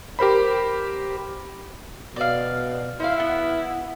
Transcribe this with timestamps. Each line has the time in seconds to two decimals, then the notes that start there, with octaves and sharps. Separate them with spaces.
0.19 G4 A#4 C5 B5
2.16 B2 D5 F5
3.00 E4 C5 F5
3.18 B3 F#5